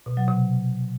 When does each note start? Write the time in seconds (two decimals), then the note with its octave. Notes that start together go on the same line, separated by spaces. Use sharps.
0.06 B2
0.17 F#3
0.28 C3